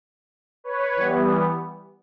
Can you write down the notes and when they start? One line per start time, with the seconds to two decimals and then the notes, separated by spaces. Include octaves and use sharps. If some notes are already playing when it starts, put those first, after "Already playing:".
0.64 B4 C#5
0.96 E3 G3 B3